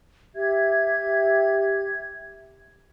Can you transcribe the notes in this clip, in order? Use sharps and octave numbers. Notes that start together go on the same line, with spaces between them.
G4 E5 G#6